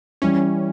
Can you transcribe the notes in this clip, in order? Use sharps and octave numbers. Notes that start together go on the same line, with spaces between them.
E3 G3 C#4